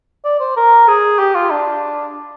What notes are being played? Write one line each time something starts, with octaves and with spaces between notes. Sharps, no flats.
D5
C5
A#4
G#4
G4
F4
D4